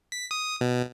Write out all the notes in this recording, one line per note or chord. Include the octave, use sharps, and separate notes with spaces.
B6
D#6
B2